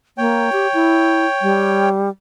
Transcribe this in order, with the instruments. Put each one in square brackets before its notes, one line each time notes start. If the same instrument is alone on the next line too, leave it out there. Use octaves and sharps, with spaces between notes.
[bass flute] A#3 [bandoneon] C#5 G5
[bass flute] G4
E4
G3